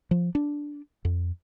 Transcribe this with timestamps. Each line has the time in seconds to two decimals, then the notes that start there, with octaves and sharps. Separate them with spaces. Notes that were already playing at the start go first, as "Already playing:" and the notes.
0.11 F3
0.35 D4
1.05 F2